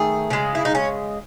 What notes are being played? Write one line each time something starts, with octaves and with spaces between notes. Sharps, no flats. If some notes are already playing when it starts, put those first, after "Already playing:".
Already playing: D#3 A3 G#4
C#3 G#3
E4
D#4
C#4